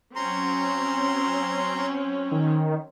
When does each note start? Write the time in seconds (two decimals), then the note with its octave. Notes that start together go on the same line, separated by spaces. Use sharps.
0.16 F#3 C4 C#4 A#5 C6
2.31 D#3